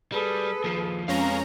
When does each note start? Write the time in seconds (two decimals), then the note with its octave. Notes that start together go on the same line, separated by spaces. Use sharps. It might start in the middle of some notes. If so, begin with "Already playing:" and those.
0.12 G3 G#4 A4 B4
0.64 D#2 F3
1.08 F2 G#3 C#4 B4 F5 A#5